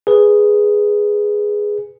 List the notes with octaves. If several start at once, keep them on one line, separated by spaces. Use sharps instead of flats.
G#4 B4